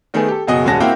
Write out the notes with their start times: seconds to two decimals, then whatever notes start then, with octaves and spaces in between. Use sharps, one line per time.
0.14 D#3 A3 B3 G#4
0.28 G4 A4
0.47 F#1 B2 F#4 G#4 D#5 D#6
0.65 D#1 G#3 C#4 F#4 A5 A#6
0.80 A#3 C4 E4 F#4 F5 G5